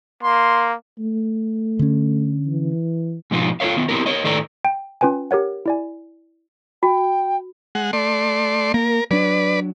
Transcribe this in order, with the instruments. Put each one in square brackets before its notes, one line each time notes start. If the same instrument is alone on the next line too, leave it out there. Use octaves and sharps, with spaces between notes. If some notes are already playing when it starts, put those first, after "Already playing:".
[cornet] A#3 [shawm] C6
[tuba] A3
[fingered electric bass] D3 C#4
[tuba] E3
[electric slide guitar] G#2 B2 F3 D#4 F4
F4 A4 B4 C#5 F5
D#3 F#3 B3
B3 C4 E4 G4 A#4
A#4 C#5 D#5
A2 D#3 A4 B4 D5 A#5
[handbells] G5
C#4 F4 B4 G5 G#5
G4 A#4 C#5 F#5
E4 D5 G#5
[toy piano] F#4 [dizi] G5
[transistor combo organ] G#3 F#5
A3 D5 C6
[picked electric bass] A#3 [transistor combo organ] A#4
[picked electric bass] F#3 D4 [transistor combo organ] B4 D5